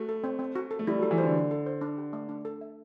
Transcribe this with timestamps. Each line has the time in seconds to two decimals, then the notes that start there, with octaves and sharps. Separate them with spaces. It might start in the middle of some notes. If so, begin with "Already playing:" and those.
Already playing: A3 F#4
0.09 A4
0.24 C4
0.39 C4
0.56 F#4
0.71 A4
0.79 A3
0.87 G3 E4
0.99 F#3 A4
1.11 E3
1.18 C5
1.23 D3
1.34 E4
1.51 A4
1.66 C5
1.81 D4
1.98 G4
2.13 A3
2.29 D4
2.45 A4
2.61 E5